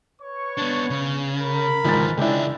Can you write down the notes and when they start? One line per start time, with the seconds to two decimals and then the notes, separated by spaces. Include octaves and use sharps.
0.21 B4 C#5 C#6
0.58 B3 D4
0.90 C#3
1.40 A#4 B5
1.84 C#2 G#2 D#3 E3 A6
2.17 C#2 G#3 C#4 D4 E4 E5 G5